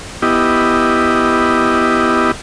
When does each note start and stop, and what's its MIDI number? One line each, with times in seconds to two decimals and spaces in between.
0.22 2.31 59
0.22 2.31 64
0.22 2.31 67
0.22 2.31 75